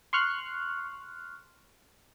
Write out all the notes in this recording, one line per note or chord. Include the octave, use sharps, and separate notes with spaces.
C6 C#6 F6 F#6